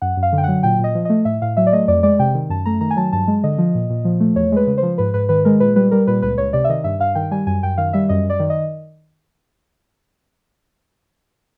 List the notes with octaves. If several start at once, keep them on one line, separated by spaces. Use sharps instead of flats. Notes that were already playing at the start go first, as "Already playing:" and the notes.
F#2 F#5
F#2
F5
D3
G5
F#3 F#5
A#2 G5
A#2 D#5
F3
A3 D#5
A2 E5
A2 F5
F#3 E5
D5
A3 D#5
F2 D5
G#3 D5
C3 G5
D#3
F#2 A5
A3 A#5
D#3 A#5
G#5
F#3 A5
G2 A5
G#3
D3 D#5
F3
A#2
A#2
F3
A3
E2 C#5
G#3 B4
C#3
C5
F3
G#2 B4
G#2 B4
D#3 B4
G#3 A#4
A#2 B4
G3 B4
G3 A#4
A#2 B4
C#2 B4
C#2 C#5
C3 D5
E5
D#3 D#5
G2 E5
G2 F5
D#3 G5
G3 G#5
F#2 G#5
F#2 G5
D#3 F5
G3 E5
F#2 D#5
F#2
D5
D#3
D#5